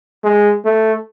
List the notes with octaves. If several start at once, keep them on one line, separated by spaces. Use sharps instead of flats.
G#3
A3